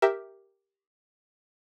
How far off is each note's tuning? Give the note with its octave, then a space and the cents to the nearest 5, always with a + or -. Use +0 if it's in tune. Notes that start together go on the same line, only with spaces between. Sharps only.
G4 +0 A#4 +0 E5 +0